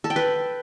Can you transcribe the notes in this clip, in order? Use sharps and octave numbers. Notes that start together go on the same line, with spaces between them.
A4
G5
B4